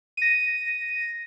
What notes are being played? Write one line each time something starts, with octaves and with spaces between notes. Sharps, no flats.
A#6 D#7